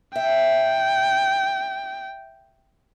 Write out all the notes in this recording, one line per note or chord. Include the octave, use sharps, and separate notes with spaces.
E5 G5